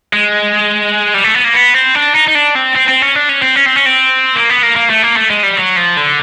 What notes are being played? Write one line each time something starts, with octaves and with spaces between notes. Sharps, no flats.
G#3
G3
A3
B3
A#3
B3
C4
D4
D#4
D#4
D4
C4
C4
C4
C#4
D4
C#4
C4
C#4
C4
C#4
C4
A#3
B3
A#3
A#3
A3
A#3
A3
G#3
G3
F#3
F3
D3